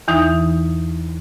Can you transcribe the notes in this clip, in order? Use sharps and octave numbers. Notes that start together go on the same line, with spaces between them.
E2 E3 D#4 D#6